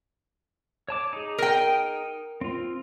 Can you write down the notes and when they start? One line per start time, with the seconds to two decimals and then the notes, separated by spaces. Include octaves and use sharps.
0.88 C#5 A5 D6
1.13 D#4 G#4
1.38 A#4 G5
2.41 C4 F4